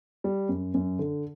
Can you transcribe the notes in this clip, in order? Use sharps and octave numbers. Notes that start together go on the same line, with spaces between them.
G3
F#2
F#2
D3